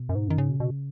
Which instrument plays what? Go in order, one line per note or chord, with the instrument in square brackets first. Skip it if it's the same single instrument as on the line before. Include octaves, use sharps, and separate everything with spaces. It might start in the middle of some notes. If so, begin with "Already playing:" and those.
Already playing: [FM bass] B2
[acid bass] F#2
G#2
[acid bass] F#2 [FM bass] D#3
[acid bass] G#2 [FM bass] C#3
[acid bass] B2
B2